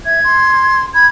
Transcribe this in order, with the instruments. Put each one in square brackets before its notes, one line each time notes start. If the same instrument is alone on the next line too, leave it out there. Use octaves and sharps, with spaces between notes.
[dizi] E5 [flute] G#6
[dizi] C6
[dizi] B5 [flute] G#6